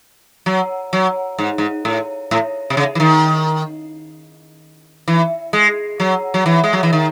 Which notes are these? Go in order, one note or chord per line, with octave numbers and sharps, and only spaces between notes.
F#3
F#3
G#2
G#2
A2
A2
C3
C#3
E3
D#3
E3
G#3
F#3
F#3
E3
G#3
F#3
E3
D#3